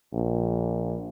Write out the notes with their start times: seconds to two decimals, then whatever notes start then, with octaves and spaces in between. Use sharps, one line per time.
0.13 A#1